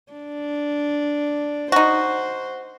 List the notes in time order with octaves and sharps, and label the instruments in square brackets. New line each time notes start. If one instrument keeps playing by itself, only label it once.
[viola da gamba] D4
[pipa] D#4 F#4 [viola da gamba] C5